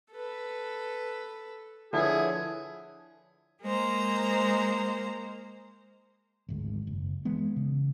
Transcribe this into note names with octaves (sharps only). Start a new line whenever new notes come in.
A4 B4
D3 F3 E4 G#4 B4 C#5 E5
G#3 A#3 C5 A#5
G#1 D2 G#3
F#1
E3 G#3 B3
C#3